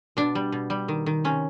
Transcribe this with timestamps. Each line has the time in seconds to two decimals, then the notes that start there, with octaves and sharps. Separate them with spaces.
0.17 B2 D4
0.35 G3
0.52 B2
0.70 G3
0.88 D#3
1.06 D#3
1.24 C3 C#4